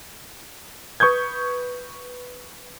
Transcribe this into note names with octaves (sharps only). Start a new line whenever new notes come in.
B4 C#6 D#6 G6 G#6